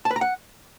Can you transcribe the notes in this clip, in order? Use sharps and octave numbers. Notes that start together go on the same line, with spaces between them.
A5
B4
A#5
F#5